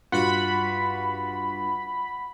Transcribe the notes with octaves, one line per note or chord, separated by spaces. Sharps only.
G2 F4 F#4 F#5 B5